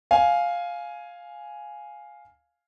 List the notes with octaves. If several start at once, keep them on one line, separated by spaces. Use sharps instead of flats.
F5 G#5